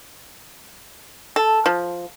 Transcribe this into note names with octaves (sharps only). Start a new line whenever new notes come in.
A4
F3